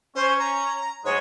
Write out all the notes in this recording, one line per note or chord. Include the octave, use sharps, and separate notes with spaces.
C#4 C5
A#5
G#2 F#3 G#3 C#5